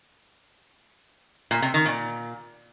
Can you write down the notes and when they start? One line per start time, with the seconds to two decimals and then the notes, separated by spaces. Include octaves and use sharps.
1.51 A#2
1.62 C3
1.74 D#3
1.85 A#2